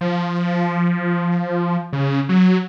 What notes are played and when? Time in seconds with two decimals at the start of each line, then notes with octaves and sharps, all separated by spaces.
0.01 F3
1.93 C#3
2.29 F#3